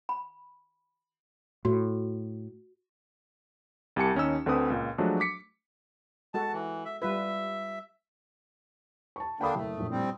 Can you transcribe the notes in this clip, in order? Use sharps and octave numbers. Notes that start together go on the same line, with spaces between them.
B5
A2 F#4
C2 G4 G#5 A5 C#7
D#2 C#4 D#4 E6
D2 D3 C4 B4 D#6
C#2 A#2
F3 F#3 G#3 A3 D4 F#4
D6 B6 C#7
G#3 F#4 A4 A5
E3
E5
G3 F4 B4 E5
A5 C#6
D3 A#3 D4 G5 B5 D#6
F#1 A3
A#1 A2
G3 C4